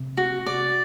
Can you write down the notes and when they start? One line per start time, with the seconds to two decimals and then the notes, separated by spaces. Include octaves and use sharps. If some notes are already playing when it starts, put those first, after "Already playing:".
Already playing: C3
0.17 F#4
0.46 D5